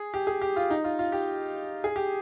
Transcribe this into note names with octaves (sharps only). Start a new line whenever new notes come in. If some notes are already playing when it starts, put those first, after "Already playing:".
Already playing: G#4
G4
G#4
G4
F4
D#4
F4
F4
G4
G#4
G4